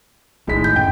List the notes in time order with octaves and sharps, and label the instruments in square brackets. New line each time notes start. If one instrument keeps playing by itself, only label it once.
[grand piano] A2 G#3 B6 [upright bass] D#3 D#4
[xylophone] G6
[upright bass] F#2 [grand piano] G5